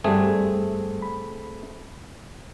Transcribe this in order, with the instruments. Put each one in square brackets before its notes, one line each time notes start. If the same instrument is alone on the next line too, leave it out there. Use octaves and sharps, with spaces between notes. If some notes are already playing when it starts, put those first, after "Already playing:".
[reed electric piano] G2 G3 [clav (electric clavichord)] A3 C4 G#4
[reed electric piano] B5